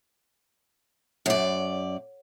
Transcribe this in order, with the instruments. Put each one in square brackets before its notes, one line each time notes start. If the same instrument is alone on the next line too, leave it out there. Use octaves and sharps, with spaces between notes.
[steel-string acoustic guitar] F#2 D5 [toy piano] A4 C#5 F#5